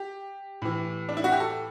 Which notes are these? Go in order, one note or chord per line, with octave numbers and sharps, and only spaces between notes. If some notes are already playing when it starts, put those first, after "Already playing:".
Already playing: G4
A2 E3
D4
E4
F#4
G4
A4